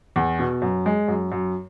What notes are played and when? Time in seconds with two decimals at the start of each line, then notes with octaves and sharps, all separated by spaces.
0.16 E2
0.39 B2
0.62 F#2
0.86 G#3
1.08 F#2
1.32 F#2